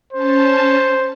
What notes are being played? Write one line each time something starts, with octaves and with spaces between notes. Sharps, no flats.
C#4 C5 A5